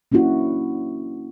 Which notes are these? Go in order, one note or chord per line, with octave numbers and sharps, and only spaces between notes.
A#3 C#4 D4 E4 F#4